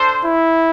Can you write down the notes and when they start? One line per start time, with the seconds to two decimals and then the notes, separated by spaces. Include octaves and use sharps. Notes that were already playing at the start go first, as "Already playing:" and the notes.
Already playing: D4 A4 C5
0.25 E4